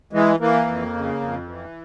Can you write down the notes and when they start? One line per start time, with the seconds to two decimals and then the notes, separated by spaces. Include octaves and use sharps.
0.13 E3 G#3
0.40 E3 A#3
0.67 F2
0.94 C#3
1.21 F2
1.48 E3